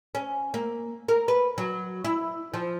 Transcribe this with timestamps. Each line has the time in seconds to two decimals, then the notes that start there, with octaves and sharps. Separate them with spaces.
0.15 C#4
0.54 A#3
1.08 A#4
1.28 B4
1.58 F#3
2.05 E4
2.54 F3